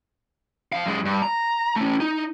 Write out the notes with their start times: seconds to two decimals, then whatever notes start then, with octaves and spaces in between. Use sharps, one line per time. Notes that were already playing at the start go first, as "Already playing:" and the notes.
0.72 F2 F5
0.86 F#2 G#3
1.05 G2
1.22 A#5
1.76 A3 C#4
2.00 D#4